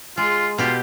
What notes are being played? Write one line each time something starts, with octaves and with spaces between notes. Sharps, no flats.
G#3 F4
B2 F4 G4